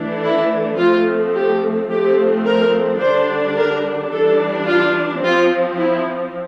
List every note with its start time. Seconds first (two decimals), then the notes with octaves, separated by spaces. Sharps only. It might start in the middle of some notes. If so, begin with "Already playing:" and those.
Already playing: E3 A3 D4
0.23 E4
0.78 F3 A3 C4 F4
1.35 G4
1.90 F3 A3 C4 G4
2.46 A#4
3.00 D3 G3 D4 C5
3.57 A#4
4.12 E3 G3 D4 A4
4.67 F4
5.23 F3 C4 F4
5.78 E4